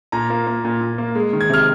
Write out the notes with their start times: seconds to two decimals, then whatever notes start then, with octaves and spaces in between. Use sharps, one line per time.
0.12 A#2 A#5
0.30 A#3
0.47 A#3
0.65 A#2
0.81 A#2
0.98 A#3
1.15 G#3
1.33 D#3
1.41 G#6
1.50 C3 F6